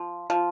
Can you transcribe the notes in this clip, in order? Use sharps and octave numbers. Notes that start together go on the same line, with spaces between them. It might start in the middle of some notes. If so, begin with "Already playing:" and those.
Already playing: F3
F3